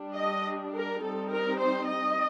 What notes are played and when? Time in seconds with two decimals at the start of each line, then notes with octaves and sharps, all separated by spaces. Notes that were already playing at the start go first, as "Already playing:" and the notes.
Already playing: G3 D4
0.15 D#5
0.73 A#4
1.02 G3 C4 D#4 A4
1.31 A#4
1.59 C5
1.88 D#5